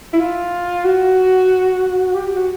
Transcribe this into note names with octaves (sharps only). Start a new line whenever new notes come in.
E4
F4
F#4
G4
F#4